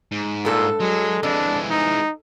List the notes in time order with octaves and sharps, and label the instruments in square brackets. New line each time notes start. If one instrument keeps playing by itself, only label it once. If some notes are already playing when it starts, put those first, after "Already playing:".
[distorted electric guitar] G#2
[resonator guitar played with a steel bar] G2 A4 [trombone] A#2
[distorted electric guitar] F#3 [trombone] G#3
[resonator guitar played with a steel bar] F2 [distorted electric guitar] E3 G#3 [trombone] D4
[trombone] D#4